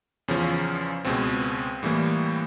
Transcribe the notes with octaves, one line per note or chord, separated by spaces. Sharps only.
E2 C#3 F3 C#4
C#2 B2 G#3 C4
A2 E3 G3 A#3